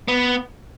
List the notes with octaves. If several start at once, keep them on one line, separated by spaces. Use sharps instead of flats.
B3